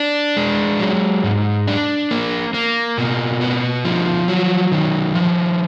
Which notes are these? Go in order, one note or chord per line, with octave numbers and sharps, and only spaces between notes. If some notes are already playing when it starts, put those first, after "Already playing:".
Already playing: D4
G#3
F#3
G#2
D4
A#3
A#3
B2
B3
F3
F#3
D#3
F3